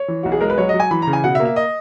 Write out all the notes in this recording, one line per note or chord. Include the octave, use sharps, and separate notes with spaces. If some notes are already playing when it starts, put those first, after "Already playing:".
Already playing: C#5
E3
B1 F#4
G#4
G#3 A#4
B4
F#3 C#5
D#5
F#3
G#5
E3 B5
C#3 A#5
G#5
B2 F#5
E5
A#3
E5
D#5